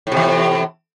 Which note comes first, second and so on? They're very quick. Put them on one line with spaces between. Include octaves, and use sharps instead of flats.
A2 C3 E2